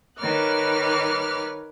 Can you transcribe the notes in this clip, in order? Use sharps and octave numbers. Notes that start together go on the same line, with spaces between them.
D#3 B4 C#5 D6 F6 F#6